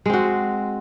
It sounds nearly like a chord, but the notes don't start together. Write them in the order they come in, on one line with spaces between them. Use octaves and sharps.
G#3 C4 F#4